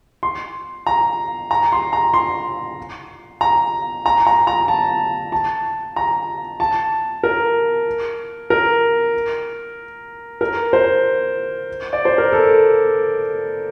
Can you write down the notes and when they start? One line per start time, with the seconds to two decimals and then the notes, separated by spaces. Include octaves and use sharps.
0.23 C6
0.87 A#5
1.51 A#5
1.72 C6
1.93 A#5
2.14 C6
3.41 A#5
4.06 A#5
4.27 A#5
4.47 A#5
4.68 A5
5.32 A5
5.96 A#5
6.60 A5
7.23 A#4
8.50 A#4
10.41 A#4
10.73 C5
11.93 D5
12.05 C5
12.18 A#4
12.33 A4